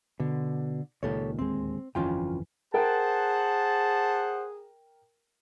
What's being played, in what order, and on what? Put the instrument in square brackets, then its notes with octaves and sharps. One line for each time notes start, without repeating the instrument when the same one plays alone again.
[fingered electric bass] B2 [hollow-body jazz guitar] D3
[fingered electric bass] C#2 A#2 D#3 [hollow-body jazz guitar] G4 A4 C#5
[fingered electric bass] D1 D#2 G#3 [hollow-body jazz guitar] C4
[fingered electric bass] G1 F2 E3 [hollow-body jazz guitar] C#4 F4 G5
[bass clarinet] G#4 [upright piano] A#4 G5 [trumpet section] C5 F#5 [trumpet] A5